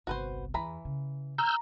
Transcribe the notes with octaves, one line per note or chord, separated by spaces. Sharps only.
G1 C2 F#4 B4 C5
E2 E3 D4 A#5 B5
C#3
A#5 E6 F6 G6